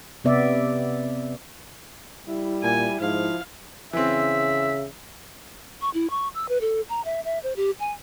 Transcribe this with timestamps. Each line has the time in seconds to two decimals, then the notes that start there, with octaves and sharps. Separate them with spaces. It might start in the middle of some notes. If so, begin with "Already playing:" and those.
0.24 C3 B3 D5 E5
2.27 G3 E4
2.63 A#2 G#5
3.00 G#2 F3 F5
3.93 C#3 E3 C4 E5
5.81 C#6
5.94 E4
6.10 C#6
6.34 E6
6.49 B4
6.61 A4
6.89 A#5
7.05 E5
7.25 E5
7.43 C5
7.56 G4
7.80 G#5